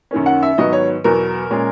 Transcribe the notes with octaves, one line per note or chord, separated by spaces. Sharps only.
F#2 D#3 A#3 C#4
F#5
E5
G#2 D#3 F#3 B3 D#5
C#5
E2 B2 F#3 B3 A#4
A#2 G#3 C#4